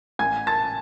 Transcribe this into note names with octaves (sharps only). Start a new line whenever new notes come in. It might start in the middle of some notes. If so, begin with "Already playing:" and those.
A1 G#5 G#6
A5 A6